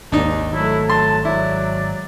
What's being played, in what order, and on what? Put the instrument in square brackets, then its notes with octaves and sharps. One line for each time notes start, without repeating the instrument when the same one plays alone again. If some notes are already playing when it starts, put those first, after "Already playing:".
[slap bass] G#1 [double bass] D#2 [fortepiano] D4 D#4
[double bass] F#3 A3 [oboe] E4
[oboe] A5 [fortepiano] C6
[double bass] G#2 F#3 [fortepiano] E4 [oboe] D5